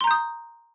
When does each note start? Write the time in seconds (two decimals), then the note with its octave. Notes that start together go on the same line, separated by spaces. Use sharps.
0.01 C6
0.04 A#5
0.07 G6
0.11 D#6